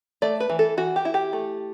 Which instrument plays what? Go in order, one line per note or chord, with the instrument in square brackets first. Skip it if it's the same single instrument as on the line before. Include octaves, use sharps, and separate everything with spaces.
[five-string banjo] A3 D5
B4
E3
A4
E3 F#4
G4
E4
G4
A3